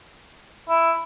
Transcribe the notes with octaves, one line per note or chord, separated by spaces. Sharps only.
E4